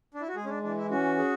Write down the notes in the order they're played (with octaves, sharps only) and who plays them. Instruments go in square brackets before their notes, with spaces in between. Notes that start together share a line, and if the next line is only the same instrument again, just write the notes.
[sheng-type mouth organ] D4
E4
F#4
[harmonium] G#3 [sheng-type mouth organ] G#4
[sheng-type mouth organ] C#4
D4
[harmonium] E3 [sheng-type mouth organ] D4
[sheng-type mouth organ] E4
[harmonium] C#4 [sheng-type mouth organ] F#4
[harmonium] G#4